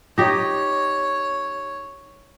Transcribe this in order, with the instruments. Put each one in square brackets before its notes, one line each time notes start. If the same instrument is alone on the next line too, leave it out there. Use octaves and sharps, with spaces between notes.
[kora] D#4 G4 [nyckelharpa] C#5